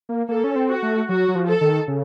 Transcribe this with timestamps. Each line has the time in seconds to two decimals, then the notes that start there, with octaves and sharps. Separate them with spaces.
0.09 A#3
0.29 A#3 A4
0.44 C#4
0.56 C4
0.69 F#4
0.83 A3
1.09 F#3 F#4
1.28 F#3
1.35 F3
1.48 A4
1.61 D#3
1.88 C#3